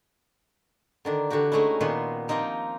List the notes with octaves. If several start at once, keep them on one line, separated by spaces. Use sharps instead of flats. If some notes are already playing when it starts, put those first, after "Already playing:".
D3 D#3 D4
D3 E3 F#4 G4
G#3 A3 C#4 D#4 E4
A#2 D#3 B3 B4 C5
F3 A#3 C4 D#4 G4